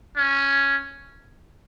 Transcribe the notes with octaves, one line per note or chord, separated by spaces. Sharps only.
C#4